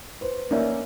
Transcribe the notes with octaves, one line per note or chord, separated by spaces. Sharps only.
B4 C5
A#3 C#4 D#4 D5 E5